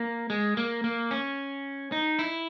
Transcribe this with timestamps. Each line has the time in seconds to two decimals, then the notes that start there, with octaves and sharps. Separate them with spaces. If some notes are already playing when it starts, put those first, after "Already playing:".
Already playing: A#3
0.30 G#3
0.57 A#3
0.84 A#3
1.11 C#4
1.92 D#4
2.19 E4